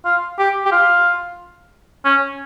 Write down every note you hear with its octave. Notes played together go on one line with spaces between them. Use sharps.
F4
G4
G4
F4
C#4